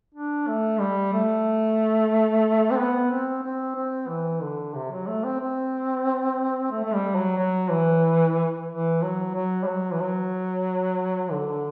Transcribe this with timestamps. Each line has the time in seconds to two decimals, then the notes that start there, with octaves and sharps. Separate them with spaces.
0.15 D4
0.48 A3
0.80 G3
1.13 A3
2.71 C4
2.78 B3
3.11 C4
3.43 C4
3.76 C4
4.08 E3
4.42 D3
4.75 C3
4.91 F#3
5.07 A3
5.24 C4
5.40 C4
6.72 A3
6.84 A3
6.94 G3
7.15 F#3
7.37 F#3
7.70 E3
8.69 E3
9.02 F#3
9.35 F#3
9.64 G3
9.68 F#3
9.92 E3
10.00 F#3
11.32 D3